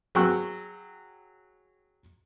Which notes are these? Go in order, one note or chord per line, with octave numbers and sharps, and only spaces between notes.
F#3 G#4 G5 C#6 E6 F#6